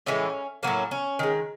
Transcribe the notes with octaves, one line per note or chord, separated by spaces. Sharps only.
A2 E3 G#3 C#4
A2 F#3 A#3 C#4
C#4
D#3 G#3